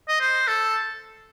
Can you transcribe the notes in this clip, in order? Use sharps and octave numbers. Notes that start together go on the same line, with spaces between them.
D#5
C5
A4